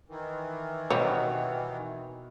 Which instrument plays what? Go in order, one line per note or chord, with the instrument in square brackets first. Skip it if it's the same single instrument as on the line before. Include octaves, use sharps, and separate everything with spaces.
[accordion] D#3 E3
[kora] B2 [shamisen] G3 C4 C#5